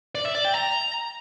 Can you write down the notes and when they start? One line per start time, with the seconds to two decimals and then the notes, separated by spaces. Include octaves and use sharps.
0.15 D5
0.25 E5
0.35 D5
0.45 G5
0.55 A#5